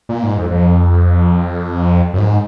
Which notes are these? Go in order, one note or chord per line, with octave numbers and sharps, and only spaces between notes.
A#2
G#2
F2
F2
F#2
G#2